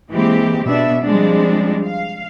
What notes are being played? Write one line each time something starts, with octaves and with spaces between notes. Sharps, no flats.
E3 G#3 A#3 C4 G4
B2 B3 D4 E5
F3 G3 G#3 C4 D4
F5